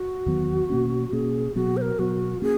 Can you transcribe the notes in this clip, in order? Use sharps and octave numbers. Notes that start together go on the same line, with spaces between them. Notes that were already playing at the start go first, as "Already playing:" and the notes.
Already playing: F#4
E2 D#3 F#3 B3
B2 A#3 C#4
B2 A#3 C#4 G#4
B2 F#3 B3 F#4
C5
A#4
B2 F#3 B3 F#4
A#3 C#4 G#4